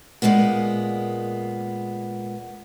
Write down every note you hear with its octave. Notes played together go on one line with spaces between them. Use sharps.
A#2 F3 G#3 A#3 B3